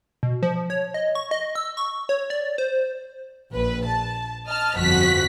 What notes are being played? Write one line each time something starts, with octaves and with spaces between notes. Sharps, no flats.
B2
F3
C#5
D#5
C#6
D#5
E6
C#6
C#5
D5
C5
A#1 B4
A5
D#5 A5 F6
G1 F2 F3 F#4 F#6 B6